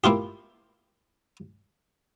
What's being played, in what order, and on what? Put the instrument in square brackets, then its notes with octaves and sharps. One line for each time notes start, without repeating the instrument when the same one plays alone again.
[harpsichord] A#3 E4 F4 G4